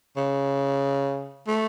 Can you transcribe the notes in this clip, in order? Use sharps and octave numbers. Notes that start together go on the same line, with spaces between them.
C#3
A3